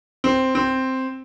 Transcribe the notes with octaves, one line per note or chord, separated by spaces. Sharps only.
C4
C4